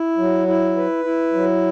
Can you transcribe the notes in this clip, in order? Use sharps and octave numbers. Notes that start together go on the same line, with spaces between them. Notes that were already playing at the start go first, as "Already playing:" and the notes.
Already playing: E4
F#3
E4
B4
E4
F#3